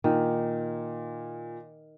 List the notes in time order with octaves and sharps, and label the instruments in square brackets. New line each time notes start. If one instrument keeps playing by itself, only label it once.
[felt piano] A#2 [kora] D#3